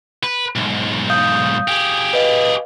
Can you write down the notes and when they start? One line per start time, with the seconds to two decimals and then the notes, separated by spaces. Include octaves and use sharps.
0.23 B4
0.56 B1 G#2
1.10 F5 D#6 G6
1.68 G4 G#4
2.13 B4 D#5 F5